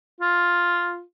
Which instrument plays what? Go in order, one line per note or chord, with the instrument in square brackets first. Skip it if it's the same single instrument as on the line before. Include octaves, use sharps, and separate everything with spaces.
[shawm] F4